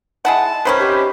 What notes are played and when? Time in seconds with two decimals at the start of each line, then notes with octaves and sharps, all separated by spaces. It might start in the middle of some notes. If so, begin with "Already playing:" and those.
0.25 G#3 E4 F#5 A5
0.65 C3 D#3 C#4 B4 C5 B5
0.79 G4